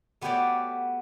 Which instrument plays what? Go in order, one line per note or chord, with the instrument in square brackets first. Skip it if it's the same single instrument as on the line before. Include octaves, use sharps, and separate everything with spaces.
[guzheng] A3 B3 F#4 G4 C#5 D5